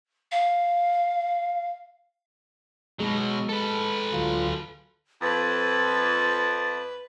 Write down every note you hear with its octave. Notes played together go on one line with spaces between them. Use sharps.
F5
B2 F#3 G#3
A4 B4
D2 F#3 F4
F2 B4 A6